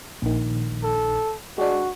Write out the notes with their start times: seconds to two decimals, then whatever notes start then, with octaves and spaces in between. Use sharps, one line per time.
0.22 A#1 D#3
0.83 A4
1.58 G#3 D4 F#4